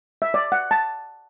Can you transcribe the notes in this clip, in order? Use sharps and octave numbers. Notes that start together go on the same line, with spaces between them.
E5
D5
F#5
A5